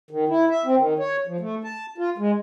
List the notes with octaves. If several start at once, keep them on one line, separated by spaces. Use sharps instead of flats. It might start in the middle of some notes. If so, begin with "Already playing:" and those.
D#3
E4
E5
C4
D#3
C#5
F3
A3
A5
F4
G#3